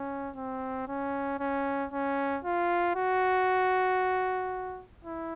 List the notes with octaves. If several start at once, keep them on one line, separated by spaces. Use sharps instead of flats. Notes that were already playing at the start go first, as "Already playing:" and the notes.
Already playing: C#4
C4
C#4
C#4
C#4
F4
F#4
E4